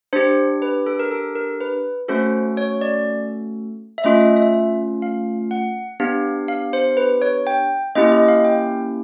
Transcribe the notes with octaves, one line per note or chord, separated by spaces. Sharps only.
D4 G4 C5
B4
A4
A#4
A4
A#4
B4
A3 C#4 F#4 A4 C5
C#5
D5
E5
A3 C#4 F4 D#5
E5
E5
F5
F#5
B3 D4 G4 F5
F5
C5
B4
C#5
G5
A#3 C#4 E4 G4 D#5
D#5
F5
G5